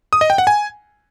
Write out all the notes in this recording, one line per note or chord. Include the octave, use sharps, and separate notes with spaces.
D#6
D#5
G5
F#5
G#5